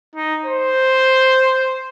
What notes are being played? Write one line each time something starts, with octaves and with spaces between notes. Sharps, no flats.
D#4
C5